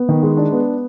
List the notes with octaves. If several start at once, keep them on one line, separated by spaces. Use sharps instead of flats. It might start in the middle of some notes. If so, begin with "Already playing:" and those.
Already playing: B3
D#3
G#3
D4
B3